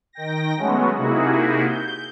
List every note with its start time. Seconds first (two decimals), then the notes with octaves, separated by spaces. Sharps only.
0.13 D#3 G5 A#6
0.57 F#3 G#3 A3 B3 C#4 F#4
0.94 C3 A#3 D#4 E4 F#4 G#4
1.66 G6